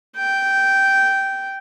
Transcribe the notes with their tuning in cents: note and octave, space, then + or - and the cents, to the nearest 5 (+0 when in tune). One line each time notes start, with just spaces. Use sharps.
G5 -10